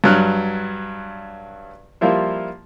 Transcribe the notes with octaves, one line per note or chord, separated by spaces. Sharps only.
G2 F#3 F6 F#6
F3 G3 A#3 E4 F4